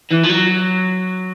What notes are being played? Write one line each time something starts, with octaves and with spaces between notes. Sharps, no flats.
E3
F3
F#3